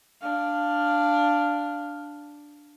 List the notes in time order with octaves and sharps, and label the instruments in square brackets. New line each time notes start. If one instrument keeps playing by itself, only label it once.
[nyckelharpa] D4 F5